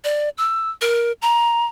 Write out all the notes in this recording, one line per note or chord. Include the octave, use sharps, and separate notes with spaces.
D5
E6
A#4
A#5